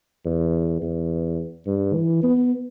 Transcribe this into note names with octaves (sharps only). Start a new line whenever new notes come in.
E2
E2
G2
E3
B3